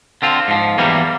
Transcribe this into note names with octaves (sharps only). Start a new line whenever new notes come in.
D3 C4 F4
G#2 F3
E2 E3 F#3 G3 A#3